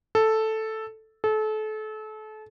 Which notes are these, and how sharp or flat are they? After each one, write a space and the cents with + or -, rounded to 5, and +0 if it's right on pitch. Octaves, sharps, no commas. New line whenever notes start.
A4 +0
A4 -30